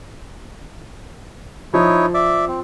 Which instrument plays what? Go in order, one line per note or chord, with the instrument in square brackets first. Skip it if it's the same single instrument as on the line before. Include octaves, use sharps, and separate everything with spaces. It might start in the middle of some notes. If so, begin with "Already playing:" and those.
[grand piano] F3 [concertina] D#4 E4 C#5
[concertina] D5 E5
C4